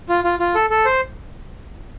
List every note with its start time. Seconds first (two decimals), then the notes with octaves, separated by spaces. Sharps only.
0.09 F4
0.24 F4
0.39 F4
0.55 A4
0.70 A4
0.85 C5